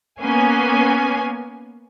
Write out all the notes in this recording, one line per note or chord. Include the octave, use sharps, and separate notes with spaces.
A#3 B3 C#4 G#5